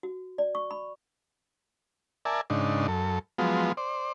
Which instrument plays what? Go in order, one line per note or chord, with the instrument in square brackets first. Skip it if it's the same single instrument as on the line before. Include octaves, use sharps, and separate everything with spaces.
[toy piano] F#4
D5
C#6
B5
[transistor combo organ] A#4 D5 E5 G#5 A5
G#2 C#3 D4 D#4
F#2 A4
F3 F#3 G#3 B3 F4
C5 D5